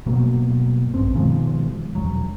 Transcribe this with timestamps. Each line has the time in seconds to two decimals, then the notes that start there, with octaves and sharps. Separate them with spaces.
0.06 G1 B2 F#3 A#3
0.94 A#1 G2 C4
1.15 B2 D#3 F3 G#3
1.95 E1 D#2 F#3